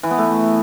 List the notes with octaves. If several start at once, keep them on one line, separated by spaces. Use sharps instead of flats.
E3
B3
A3